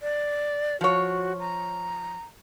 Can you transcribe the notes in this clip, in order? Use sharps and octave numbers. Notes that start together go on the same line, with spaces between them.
D5
F3 F#4 C#5
A#5